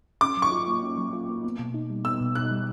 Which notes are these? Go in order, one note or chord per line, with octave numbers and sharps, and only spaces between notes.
C#4 D6
F#3
C#6
F4
A#3
C#4
F#3
F4
A#3
B3
B2
D#4
G3
B3 E6
B2
D#4 F#6
G3